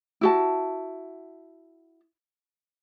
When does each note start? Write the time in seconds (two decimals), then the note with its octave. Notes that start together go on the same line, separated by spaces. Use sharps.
0.21 E4 F#4 A5